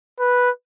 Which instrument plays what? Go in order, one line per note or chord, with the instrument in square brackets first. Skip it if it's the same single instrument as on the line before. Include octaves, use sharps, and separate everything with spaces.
[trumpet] B4